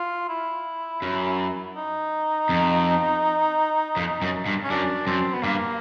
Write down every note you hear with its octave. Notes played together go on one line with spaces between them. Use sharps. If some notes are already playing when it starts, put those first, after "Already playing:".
Already playing: F4
E4
F#2
D#4
F2
F2
F#2
G2
C#4
F#2 D4
F#2 C4
B3
G2 A#3